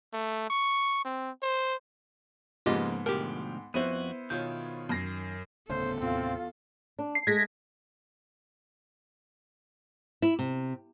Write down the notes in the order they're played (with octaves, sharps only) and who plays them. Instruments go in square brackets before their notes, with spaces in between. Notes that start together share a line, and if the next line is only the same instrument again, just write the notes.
[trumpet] A3
C#6
C4
C5
[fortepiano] G#2 B3 [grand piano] C#3 F3 A#3 [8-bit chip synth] F4 G4 D#5
[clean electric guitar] D2 B2 F3 [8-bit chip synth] G4 A#4 [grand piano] G5
[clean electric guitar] F2 F#4 [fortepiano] B3 E4 C5 [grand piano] D#7
[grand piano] B2 F4 C#5 [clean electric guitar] D#3 [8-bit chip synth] G6
[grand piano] F#2 A#6 C7
[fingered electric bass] D1 C#3 A3 [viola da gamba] E2 A4 [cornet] C5
[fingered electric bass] D#2 A2 C3 [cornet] C4 [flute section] F4
[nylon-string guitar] D4
[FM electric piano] C7
[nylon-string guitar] G#3 A3 G#4 [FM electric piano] G#6 A#6 B6
[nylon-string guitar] E4
C3